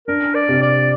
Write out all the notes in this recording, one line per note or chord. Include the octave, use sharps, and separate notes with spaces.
D4 A#4
D5
C3
D5